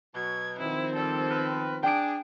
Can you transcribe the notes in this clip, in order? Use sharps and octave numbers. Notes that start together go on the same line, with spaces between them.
B2 F#3 G#6
D#3 F3 C4 E4
G3 A4
B3 A#4 B4
D4 G#4 G5 D7